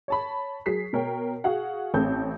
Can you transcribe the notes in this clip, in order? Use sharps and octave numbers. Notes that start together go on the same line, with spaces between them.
C#5 A5 B5
F#3 G#4 B6 C7
B2 A#4 C#5 G5
F#4 G#4 F5 F#5
A1 A3 C4 A5 G6